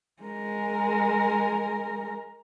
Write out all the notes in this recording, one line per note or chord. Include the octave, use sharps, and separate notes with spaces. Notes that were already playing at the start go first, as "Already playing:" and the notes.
G#3 A#4